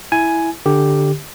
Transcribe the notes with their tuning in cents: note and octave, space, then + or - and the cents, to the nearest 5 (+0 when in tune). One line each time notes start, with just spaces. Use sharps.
E4 +0 G#5 +5
D3 +0 G4 +0